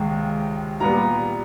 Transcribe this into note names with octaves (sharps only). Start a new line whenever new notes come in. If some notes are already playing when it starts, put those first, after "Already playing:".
Already playing: C#2 C3 D#3 G#3
A#2 G3 B3 A#5